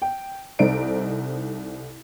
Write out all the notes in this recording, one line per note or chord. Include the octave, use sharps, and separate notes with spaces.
G5
C2 D#4 A4 C5 D5 D7